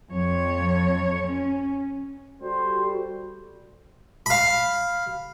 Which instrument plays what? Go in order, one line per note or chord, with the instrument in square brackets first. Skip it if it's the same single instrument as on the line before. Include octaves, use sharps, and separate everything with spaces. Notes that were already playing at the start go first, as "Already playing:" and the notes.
[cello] F2 C#5
C#4
[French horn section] G3 A4 [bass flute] F#4 [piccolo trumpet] C5
[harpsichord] F5 B5